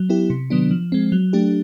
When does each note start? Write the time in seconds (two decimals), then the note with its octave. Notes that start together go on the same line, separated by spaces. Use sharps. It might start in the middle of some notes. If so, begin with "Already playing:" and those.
Already playing: F#3
0.09 B3 E4 G4
0.30 C3
0.50 D#3 F#3 B3 D4
0.71 F3
0.92 G#3 C4
1.12 F#3
1.33 A3 D4 G4